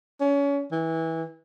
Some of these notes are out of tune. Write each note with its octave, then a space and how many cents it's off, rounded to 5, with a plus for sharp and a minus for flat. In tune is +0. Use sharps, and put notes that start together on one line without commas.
C#4 +30
E3 -20